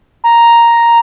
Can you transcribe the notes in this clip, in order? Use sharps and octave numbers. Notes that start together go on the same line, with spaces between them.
A#5